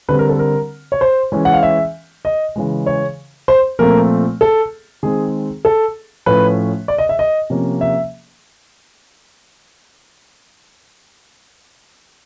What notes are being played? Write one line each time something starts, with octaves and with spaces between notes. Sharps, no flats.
D3 G3 C4 B4
A#4
A4
A#4
C#5
C5
E3 G#3 C#4
F#5
F5
E5
D#5
C#3 E3 G#3
C#5
C5
A#2 F3 A3 C4 A#4
A4
D#3 G#3 C4 G#4
A4
A2 F3 A3 C#4 B4
D5
D#5
E5
D#5
C3 F3 A#3 C#4
E5